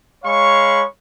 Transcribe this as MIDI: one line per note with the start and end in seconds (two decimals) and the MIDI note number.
0.24 0.83 56
0.24 0.83 73
0.24 0.83 77
0.24 0.83 83
0.24 0.83 85